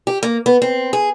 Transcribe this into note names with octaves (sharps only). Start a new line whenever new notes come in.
G4
A#3
B3
C4
G#4